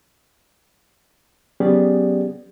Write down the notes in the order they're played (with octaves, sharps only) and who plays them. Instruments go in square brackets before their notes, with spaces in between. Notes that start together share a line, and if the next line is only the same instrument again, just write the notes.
[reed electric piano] F#3 B3 C#4 G4 G#4 D5